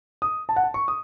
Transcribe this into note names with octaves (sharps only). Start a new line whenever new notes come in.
D#6
A5
F#5
A5
C#6
D#6